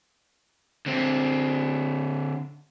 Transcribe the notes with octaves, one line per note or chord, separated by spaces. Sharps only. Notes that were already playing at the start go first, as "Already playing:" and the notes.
D3 C4